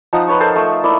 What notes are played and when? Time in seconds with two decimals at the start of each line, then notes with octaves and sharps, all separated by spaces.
0.13 F3 D#4 F#5 A#5
0.27 B4 C#5 A5 C#6
0.40 A4 A#4 C5
0.56 A3 C#6
0.84 A#3 E4 D5